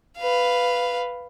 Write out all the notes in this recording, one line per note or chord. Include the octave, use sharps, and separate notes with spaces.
B4 F5